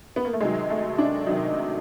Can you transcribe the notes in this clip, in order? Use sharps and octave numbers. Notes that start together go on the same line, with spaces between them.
B3
A#3
A3
C3 D#3 F#3 G#3
A3
D4
C3 D#3 F#3 D#4